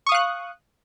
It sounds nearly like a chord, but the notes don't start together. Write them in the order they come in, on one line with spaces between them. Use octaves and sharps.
C#6 D#6 F5 F#6